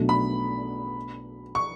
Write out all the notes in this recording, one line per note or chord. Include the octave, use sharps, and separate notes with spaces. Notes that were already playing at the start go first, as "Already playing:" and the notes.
Already playing: B1 B2 A3 D4
B5
C#6